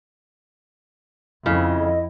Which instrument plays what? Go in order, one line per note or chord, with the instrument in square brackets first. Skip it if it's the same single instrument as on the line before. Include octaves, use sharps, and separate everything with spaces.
[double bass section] F2 [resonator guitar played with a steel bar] C#3 [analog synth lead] E4 [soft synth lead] D#5